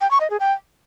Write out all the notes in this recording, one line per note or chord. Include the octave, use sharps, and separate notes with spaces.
G5
C#6
D#5
G#4
G5